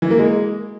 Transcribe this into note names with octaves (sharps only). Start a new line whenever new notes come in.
E3
A#3
G#3